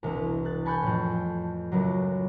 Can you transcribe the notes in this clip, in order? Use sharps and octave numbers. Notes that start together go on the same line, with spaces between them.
E1 C2
F#6 A6
G#5 A5 B5 C#6 F#6 G6
F2 A2
C#2 F#2 C#3 F#3